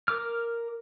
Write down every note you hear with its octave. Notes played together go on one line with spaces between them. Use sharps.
A#4 D6 F6